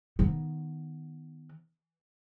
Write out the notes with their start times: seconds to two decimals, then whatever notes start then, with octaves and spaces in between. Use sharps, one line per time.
0.19 D#3 B3